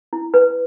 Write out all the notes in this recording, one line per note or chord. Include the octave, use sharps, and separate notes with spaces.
E4
B4